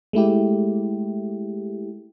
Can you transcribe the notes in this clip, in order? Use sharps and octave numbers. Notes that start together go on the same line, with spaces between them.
G#3 A3 E4 G4